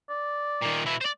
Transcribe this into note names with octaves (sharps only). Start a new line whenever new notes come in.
D5
A#2 D#3
B2 E4
C5 D5